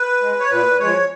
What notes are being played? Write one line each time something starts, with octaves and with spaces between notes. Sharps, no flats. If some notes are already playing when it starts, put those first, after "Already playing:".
Already playing: B4
G#3
C#5
A#2 B4
F3 G#3 C#5